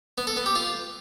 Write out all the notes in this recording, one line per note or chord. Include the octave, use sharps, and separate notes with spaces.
B3
A4
B3
G4
F4